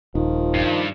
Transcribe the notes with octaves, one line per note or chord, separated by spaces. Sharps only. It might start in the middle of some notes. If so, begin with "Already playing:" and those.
D#1 D#3 F3
G2